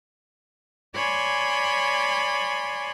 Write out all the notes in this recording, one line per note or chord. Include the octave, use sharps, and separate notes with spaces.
C#5 D5 G#5 B5 C6